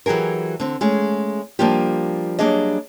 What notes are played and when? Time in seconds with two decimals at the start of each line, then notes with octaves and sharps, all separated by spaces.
0.06 E3 F#3 G4 G#4 A#4
0.60 D3 C4
0.81 G#3 A3 C#4 G#4
1.59 F3 G3 A#3 D4 F4 G4
2.39 F#3 G3 A#3 D4 G#4 D#5